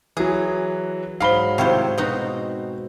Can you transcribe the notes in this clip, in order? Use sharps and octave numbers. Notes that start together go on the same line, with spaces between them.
E3 F#3 G#4
G#2 F#3 F5 B5 G7
A2 C3 D#3 C5 C#5 F5
B2 C4 D#4 F#4